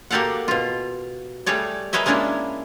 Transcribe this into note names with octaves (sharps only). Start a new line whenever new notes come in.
A#3 F#4 G4 A4 F5 F#5
B2 F4
G3 A3 G#4 C#5 D5
G#4 A#4 B4 C#5 D#5 E5
G#3 A#3 C#4 D4 E4 G#4